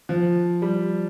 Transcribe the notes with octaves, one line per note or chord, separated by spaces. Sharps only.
F3
G3